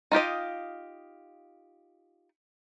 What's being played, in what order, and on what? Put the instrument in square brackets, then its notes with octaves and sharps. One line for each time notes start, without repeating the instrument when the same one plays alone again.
[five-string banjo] D#4 F4 G4 D#5